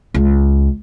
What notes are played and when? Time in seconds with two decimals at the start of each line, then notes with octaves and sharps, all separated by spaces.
0.14 C#2